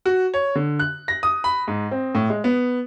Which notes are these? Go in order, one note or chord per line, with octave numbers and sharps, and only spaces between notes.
F#4
C#5
D3
F#6
A#6
D#6
B5
G#2
C4
A2
G#3
B3